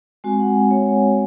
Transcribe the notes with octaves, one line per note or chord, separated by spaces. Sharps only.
G#3 C4 F#4 G#5
F#5
C#5
C#5